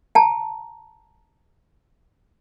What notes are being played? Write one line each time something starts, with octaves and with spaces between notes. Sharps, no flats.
G5 A5 A#5